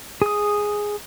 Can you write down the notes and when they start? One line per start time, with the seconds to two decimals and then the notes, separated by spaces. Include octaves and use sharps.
0.22 G#4 D#6